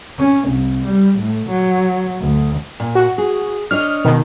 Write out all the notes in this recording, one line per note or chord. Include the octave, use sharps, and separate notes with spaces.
C#4
C2
G3
A2
F#3
D2
A#2
F#4
G#4
D4 C#5 D#5 F6
B2 D#3